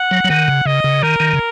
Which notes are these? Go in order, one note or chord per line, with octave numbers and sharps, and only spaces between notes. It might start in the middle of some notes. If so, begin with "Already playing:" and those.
Already playing: F#5
F#3
F#3
D#3 F#5
C#3
C#3 D#5
C#3
D#3 A#4
D#3
C#3